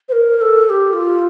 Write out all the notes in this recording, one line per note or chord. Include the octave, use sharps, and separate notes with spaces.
C5
A#4
A#4
A4
A4
G4
F4